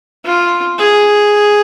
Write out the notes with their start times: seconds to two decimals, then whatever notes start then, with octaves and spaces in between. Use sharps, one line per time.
0.25 F4
0.78 G#4